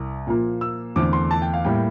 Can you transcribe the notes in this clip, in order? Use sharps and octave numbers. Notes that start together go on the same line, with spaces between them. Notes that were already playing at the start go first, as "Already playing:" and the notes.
Already playing: C2
A#2 F3 A#3
E6
E2 D3 A3 C4 D6
C6
A5
G5
F5
A2 G3 A#3 G5
G5